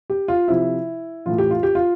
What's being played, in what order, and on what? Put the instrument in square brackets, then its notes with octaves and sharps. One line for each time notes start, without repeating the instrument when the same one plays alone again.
[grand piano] G4
F4
C3 F3 E4
A2 E3 F4
G4
F4
G4
F4